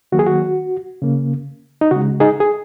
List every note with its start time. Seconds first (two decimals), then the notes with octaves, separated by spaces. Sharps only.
0.12 D#3 F#3 A#3 F#4
0.19 G#4
0.26 F#4
1.02 C#3 A#3
1.81 D#4
1.91 C#3 F#4
1.96 G#3
2.20 D#4 G#4
2.40 G#4